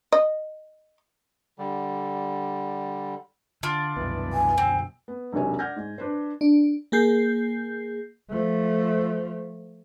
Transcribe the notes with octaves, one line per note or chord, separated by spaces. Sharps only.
D#5
D3 G3
D3 D4 F4
C2 F#2 B2 E3 B3
G#5
F#2 B2 D3 C4
B3
E1 B1 C3 F#4 C#5 G#5
D5 F#5 F6 G6 G#6 A#6
G#2
D4 B4 C5
D4
A#3 G#4 G6 C7
F3 A3